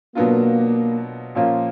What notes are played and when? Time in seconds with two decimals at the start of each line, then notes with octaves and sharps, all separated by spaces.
0.15 B2 F#3 A#3 B3 D4 F4
1.35 A#2 F3 A#3 C#4 F4